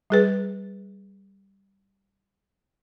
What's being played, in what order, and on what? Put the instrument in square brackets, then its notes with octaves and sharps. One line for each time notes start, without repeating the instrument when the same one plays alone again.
[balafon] G3 G#4 B4